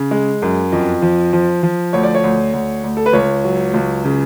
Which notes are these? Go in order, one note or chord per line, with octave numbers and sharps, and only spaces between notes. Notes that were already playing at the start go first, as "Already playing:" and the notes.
Already playing: C#3
G#3
F#2
F2
F3
F3
F3
D2 C#5
D5
C#5
D2
D2
D2
A4
B4
C#2 C#5
F#3
C#2
C#3